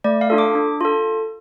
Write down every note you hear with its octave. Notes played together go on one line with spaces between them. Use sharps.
A3 D5
F5
D4 F4 A4
D6
D4
F4 A4